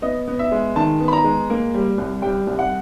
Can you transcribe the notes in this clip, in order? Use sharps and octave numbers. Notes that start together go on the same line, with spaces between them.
B3 D#5
B3
E5
G#3
D#3 A5
B3
B5
A#5
G#3
A#3
G3
C2
G3 G5
C2
F#5